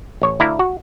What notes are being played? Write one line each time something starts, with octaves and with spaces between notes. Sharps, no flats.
A1 C#5
D2 D3 E4 F5 A#5
F#4